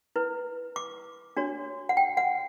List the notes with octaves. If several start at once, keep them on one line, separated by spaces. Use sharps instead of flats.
E4 B4
D6
D4 F#4 C#5
F#5
G5
F#5